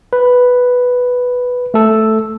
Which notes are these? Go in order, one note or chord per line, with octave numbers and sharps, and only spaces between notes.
B4
A3 A4